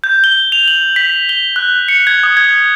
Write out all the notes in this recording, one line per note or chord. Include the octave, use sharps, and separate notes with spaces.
G6
G7
F7
F#7
B6
G7
F#6
C#7
G#6
D#6
G#6